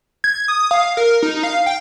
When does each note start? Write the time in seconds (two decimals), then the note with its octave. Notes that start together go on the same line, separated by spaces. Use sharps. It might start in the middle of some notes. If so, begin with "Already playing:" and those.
0.24 G#6
0.48 D#6
0.71 F5
0.97 A#4
1.23 D#4
1.43 F5
1.66 G5